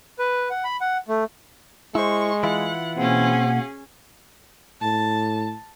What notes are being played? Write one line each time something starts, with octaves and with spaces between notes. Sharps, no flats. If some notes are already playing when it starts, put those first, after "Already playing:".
B4
F#5
B5
F#5
A3
G#3 E4 C5 C#6
E3 E4 F4 F#5
B2 A#3 C4 C#4 G#4 F#5
A2 A5